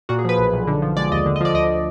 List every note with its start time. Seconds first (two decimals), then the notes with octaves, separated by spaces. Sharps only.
0.09 A#2 F#4
0.19 G#4
0.25 F3 B4
0.38 B1
0.53 B1
0.67 D3
0.82 F3
0.97 G#3 D5
1.11 D#2 D#5
1.26 D3
1.36 D#5
1.41 F3 D5
1.54 D2 D#5